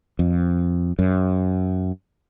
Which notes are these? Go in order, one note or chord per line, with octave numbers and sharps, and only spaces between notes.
F2
F#2